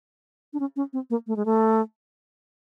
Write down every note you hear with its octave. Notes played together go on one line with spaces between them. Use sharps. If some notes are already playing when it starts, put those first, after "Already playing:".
D4
C#4
C#4
C4
A#3
A3
G#3
A3